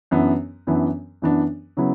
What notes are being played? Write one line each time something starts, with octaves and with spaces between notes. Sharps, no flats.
F#2 E3 B3 D4
F#2 E3 B3 D4
F#2 E3 B3 D4
C#3 F#3 B3 E4